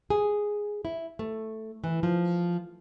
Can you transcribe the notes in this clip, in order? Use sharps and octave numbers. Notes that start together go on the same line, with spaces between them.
G#4
E4
A3
E3
F3